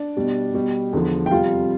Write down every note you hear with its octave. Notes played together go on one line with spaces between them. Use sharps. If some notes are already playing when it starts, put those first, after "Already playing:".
Already playing: D4 D5
B2 G3
B2 G3
E2 D3 F3
G5
F2 C3 G3 F4 F5